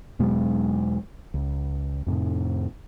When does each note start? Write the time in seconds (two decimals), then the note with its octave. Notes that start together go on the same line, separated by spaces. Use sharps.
0.19 E2 B2 F#3 G#3
1.34 C#2
2.07 F2 A2 C3